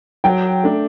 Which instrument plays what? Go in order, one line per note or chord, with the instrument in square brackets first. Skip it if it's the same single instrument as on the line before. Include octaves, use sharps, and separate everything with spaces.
[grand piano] F#3 [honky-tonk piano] G5
[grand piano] A3 D4